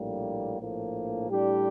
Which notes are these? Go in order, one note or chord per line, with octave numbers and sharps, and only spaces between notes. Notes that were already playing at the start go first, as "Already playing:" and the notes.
Already playing: A#1 A2 G3 A#3
A#1 A2 F3 A#3
A2 G3 D4 G4